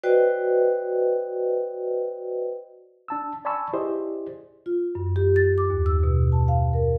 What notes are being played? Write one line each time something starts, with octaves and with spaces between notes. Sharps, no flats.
F#4 B4 C5 D5 D#5 G5
D4 A5 E6
D5 G#5 A5 B5 C#6 E6
E4 G4 G#4 C5 D5 D#5
F4
F#2
G4
A6
D6
D#2
E6
B2
A5
F5
A#4